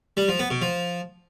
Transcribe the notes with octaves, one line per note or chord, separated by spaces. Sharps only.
G3
F3
B3
B2
F3